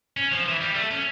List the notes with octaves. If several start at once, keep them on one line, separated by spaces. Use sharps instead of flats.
C#4
F3
E3
G3
A3
C#4